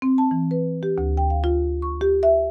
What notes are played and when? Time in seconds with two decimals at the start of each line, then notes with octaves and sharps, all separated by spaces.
0.02 C4
0.18 A5
0.31 E3
0.51 B4
0.83 G4
0.98 D2
1.17 G5
1.30 F5
1.44 F4
1.82 C#6
2.01 G4
2.23 E5